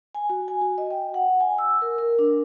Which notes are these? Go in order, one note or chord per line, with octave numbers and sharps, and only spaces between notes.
G#5
F#4
G#5
F#4
D#5
G5
F#5
G#5
E6
A#4
A#4
D4